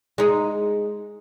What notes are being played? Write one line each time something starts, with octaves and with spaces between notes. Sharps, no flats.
G#3 D#4